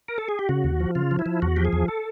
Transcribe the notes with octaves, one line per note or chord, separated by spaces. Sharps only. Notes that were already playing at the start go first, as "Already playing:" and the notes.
A#4
A4
G#4
G4
C#3 F#4
D#2
F3
C#3 F4
F3
E4
F3
E2 F#4
F3 G4
G#4
E2
A4